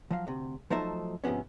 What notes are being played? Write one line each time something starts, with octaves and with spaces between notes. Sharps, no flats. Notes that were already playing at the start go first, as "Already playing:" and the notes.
F3 F#3 F5
D2 C3
F3 F#3 A3 D#4 C5 E5
G#2 C3 F3 B3 C#4